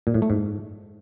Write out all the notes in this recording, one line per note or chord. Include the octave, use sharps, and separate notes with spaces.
A#2
A2
A3
G#2